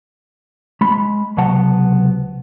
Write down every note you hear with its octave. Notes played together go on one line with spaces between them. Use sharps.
G#3 B5
C#2 C3 F#3 B3 F#5 A5